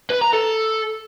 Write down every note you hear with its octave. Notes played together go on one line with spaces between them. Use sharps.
B4
A#5
A4